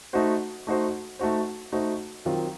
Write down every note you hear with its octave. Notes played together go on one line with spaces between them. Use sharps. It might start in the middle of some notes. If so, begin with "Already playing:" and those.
A3 D#4 F#4 C5
A3 D#4 F#4 C5
A3 D#4 F#4 C5
A3 D#4 F#4 C5
D#3 F#3 C4 F4